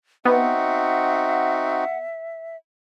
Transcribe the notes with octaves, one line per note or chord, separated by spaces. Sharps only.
B3 C4 D#4 F#4 E5 F#5